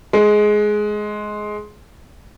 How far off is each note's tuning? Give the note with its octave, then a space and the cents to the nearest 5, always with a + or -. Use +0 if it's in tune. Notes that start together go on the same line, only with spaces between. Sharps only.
G#3 +15